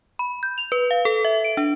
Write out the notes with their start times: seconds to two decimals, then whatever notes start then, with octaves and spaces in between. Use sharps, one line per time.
0.19 B5
0.43 G6
0.58 F7
0.72 B4
0.91 F5
1.05 A4
1.25 E5
1.44 D7
1.57 D4